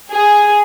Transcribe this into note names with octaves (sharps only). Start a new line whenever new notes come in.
G#4